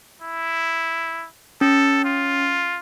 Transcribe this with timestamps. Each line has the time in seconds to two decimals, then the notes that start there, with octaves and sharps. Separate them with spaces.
0.22 E4
1.61 C#4 A4
2.05 F4